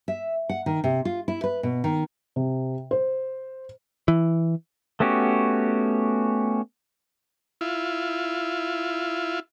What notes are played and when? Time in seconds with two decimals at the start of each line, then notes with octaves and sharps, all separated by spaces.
0.08 E5
0.49 F#5
0.66 D#3
0.84 C3
1.05 F4
1.28 E4
1.44 B4
1.63 B2
1.84 D#3
2.36 C3
2.91 C5
4.08 E3
5.00 A3 B3 C#4 F#4 G4
7.61 E4 F4